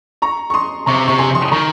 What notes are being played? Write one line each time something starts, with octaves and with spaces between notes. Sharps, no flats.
A#5 C#6
C#6
C6 D#6
C3 A#5 C#6
C3 C#6
G#5 C6
C6 D#6
D#6
D#3 A#5 C#6